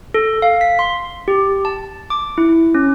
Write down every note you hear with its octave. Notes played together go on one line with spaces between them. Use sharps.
A4
F5
B6
C6
G4
A5
D6
E4
C#4